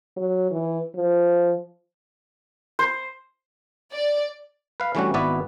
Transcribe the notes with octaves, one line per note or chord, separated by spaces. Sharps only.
F#3
E3
F3
C5
D5
B4 F5
E3 G3 A3 C#4 D4 F#4
G#1 B3 E4 F#4 B4 D5